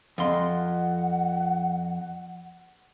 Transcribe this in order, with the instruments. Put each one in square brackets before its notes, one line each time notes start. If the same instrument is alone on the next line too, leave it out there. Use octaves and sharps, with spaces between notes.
[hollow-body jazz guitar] F2 C6 [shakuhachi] F#5